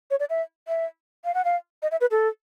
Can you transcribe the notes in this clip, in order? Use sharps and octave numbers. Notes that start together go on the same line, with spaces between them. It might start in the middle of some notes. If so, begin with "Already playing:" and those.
C#5
D5
E5
E5
F5
F#5
F5
D#5
E5
B4
A4